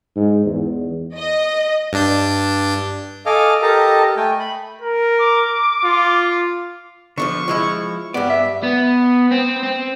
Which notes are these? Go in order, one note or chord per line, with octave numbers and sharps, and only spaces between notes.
G#2
E2
D#5
G2 D4 G6
A4 D#5 F5 G#5 D6 F6
G4 A4 A#4 D#5 A5 A#5
A3 G5 G#5
B5
A#4
D6
F4
D3 D#3 F3 C#6
F3 G#3 E4
G2 B3 D5
E5
B3
C4
C4